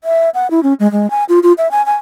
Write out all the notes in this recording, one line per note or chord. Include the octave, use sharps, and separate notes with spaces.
E5
F#5
E4
C#4
G#3
G#3
G#5
F4
F4
E5
G#5
G#5